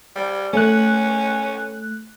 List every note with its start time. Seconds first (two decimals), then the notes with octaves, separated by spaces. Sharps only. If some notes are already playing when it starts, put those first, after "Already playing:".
0.16 G3
0.53 A3 C#4 F#6